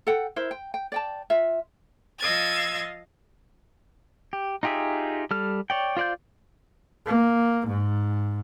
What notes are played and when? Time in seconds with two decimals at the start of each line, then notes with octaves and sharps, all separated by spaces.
0.07 A4 F#5 G5
0.36 E4 A#4 C5 E5
0.51 G5
0.74 G5
0.92 D5 G5 A5
1.30 F4 E5
2.19 F3 D#5 F5 E6 G#6 A6
4.33 G4
4.63 D#4 F4 G4 G#4 E5
5.31 G3 A4 F6
5.70 C#5 D5 G5
5.97 F4 C5 D5 F5 G6
7.06 A#3
7.68 G#2